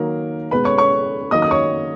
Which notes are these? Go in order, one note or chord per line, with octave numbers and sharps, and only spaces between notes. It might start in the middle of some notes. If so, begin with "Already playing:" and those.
Already playing: D#3 F#3 A#3 A#4
B2 G#3 B4 B5
C#5 C#6
C#5 C#6
D#3 F#3 A#3 D#5 D#6
D#6
C#5 C#6